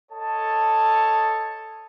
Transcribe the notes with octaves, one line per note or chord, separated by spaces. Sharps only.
A4 C#5 D#5 A5